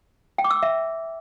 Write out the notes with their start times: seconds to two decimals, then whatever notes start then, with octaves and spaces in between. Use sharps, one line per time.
0.38 G5
0.44 D6
0.50 E6
0.57 D6
0.63 E5